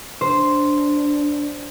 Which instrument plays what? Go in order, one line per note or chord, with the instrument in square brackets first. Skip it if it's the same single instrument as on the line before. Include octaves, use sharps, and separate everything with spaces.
[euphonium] D4 [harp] C5